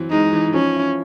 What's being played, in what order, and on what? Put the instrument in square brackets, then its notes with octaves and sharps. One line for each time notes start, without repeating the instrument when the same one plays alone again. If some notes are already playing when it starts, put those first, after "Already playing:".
Already playing: [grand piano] E3 F#3 C4
[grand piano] G#3 [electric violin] D#4
[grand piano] E3
[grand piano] F3 [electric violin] C#4
[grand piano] E4